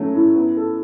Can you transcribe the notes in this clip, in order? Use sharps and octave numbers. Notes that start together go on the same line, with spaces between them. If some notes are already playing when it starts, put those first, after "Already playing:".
Already playing: F#3 A3 C#4
A2
B3
A4